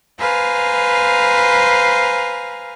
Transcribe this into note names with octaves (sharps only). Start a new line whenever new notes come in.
B4 C5 F5 G#5 A#5